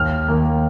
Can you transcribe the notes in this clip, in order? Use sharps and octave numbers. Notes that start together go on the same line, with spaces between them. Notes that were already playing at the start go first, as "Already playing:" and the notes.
Already playing: D#2 F6
D#3 A#3